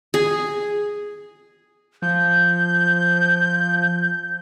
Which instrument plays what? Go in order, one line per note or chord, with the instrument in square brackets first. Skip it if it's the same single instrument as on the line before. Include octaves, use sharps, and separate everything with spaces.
[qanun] G#4
[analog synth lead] F3 [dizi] G6